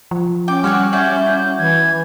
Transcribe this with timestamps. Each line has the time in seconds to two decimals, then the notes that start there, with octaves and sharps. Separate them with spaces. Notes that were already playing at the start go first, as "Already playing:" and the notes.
0.11 F3
0.48 C#4 G5 D6
0.64 G3 F#4 C#5 F#5 F6
0.93 E4 F#4 D5 G6
1.59 E3 G#6